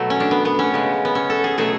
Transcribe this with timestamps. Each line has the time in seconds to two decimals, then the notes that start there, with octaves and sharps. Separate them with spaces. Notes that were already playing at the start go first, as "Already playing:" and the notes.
Already playing: B2 F#3 A3
0.10 C#4
0.20 D4
0.31 B3
0.45 B3
0.59 C#4
0.74 C#3 G#3
1.05 B3
1.15 C#4
1.30 A4
1.44 G#4
1.58 B2 F#3 A3 G#4